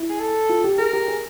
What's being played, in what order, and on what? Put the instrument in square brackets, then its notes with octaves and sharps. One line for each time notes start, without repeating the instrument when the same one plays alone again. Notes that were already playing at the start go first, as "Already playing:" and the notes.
Already playing: [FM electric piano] E4
[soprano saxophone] G#4
A4
[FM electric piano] F4
G4
[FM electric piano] G#4 [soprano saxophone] A#4
[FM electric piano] G4
G#4